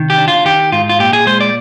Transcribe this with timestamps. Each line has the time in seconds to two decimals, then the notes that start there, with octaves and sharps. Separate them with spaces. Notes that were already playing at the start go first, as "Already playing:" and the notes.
Already playing: C3 D#3
0.10 G4
0.18 D4
0.28 F4
0.45 D#3 G4
0.72 G#2 F4
0.89 F4
0.99 A#2 G4
1.13 G#4
1.27 G#3 C5
1.41 D5